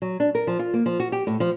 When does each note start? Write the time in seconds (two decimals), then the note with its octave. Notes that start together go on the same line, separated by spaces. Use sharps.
0.02 F#3
0.20 D4
0.35 A#4
0.47 F3
0.59 F4
0.74 A#3
0.86 F3
1.00 F#4
1.12 G4
1.27 A2
1.40 F3